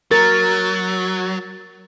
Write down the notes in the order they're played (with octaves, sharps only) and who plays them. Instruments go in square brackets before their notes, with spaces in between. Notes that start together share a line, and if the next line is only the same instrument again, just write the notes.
[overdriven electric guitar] F#3 [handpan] A#4 [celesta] A6